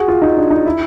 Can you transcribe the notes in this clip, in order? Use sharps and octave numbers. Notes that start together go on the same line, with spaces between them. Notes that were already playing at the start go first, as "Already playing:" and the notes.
Already playing: F#4 G#4
F4
D#4
D4
D#4
E4